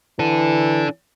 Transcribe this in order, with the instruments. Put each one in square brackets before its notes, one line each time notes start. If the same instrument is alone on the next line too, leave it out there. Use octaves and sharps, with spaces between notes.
[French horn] E3 [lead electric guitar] D4 A4